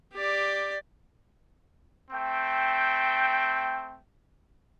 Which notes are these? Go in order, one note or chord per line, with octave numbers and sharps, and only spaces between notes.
G4 D5
A3 C4 G5